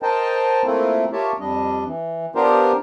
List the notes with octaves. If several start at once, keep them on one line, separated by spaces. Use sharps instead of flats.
A#4 C5 D#5 G5 A5
A3 A#3 C4 E4 F4
F4 G4 A#4 C#5 E5 A5
F2 G3 D4 D#5
E3
B3 D4 F4 G4 A#4 C5